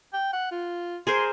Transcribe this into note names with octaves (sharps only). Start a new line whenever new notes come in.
G5
F#5
F4
G#4 A#4 C5 C6